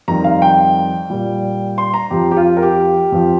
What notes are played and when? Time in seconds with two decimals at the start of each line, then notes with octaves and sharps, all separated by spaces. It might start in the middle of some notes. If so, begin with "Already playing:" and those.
0.08 F2 D#3 G3 A#5
0.24 F5
0.42 G5
1.10 A#2 G3
1.78 C6
1.94 A#5
2.10 F2 F3 G4
2.31 G4
2.37 F4
2.57 A#4
2.62 G4
3.12 F2 F3